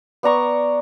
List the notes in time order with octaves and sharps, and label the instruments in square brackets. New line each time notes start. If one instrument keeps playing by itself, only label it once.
[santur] B3 D5 A#5 C#6